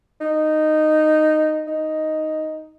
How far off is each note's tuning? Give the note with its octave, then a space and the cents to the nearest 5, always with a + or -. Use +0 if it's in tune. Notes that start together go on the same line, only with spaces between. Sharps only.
D#4 -10
D#4 +5